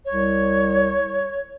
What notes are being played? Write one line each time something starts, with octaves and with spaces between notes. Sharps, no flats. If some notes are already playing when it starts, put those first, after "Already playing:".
C2 C#5